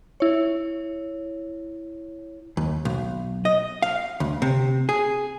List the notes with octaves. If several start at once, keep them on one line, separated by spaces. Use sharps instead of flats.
E4 C#5
D#2
B1
D#5
F5
D2
C3
G#4